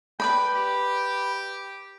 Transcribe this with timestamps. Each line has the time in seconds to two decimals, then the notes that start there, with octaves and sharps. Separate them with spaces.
0.20 B4 D5 G5 B5
0.55 G4